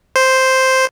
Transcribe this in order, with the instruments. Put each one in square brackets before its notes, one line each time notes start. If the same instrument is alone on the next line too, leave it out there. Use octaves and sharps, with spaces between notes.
[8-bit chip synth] C5